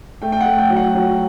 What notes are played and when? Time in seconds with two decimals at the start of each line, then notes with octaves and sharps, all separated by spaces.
0.22 A3 G5
0.32 G5
0.41 F#5
0.46 A3
0.59 G5
0.70 F#3
0.76 F#5
0.95 F#3